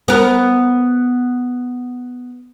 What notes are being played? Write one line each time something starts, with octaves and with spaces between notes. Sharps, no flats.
B3 A#4